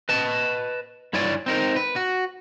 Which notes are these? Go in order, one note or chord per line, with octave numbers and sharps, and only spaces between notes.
B4 D#5 A5
G2 E4 C#5 D5 G#5
C4 D#4 A#4
B4
F#4